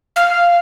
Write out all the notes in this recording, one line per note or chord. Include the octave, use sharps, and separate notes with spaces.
F5